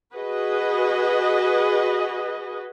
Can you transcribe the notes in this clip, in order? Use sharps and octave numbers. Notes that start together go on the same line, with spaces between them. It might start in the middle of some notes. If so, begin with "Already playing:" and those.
F#4 G#4 B4 D#5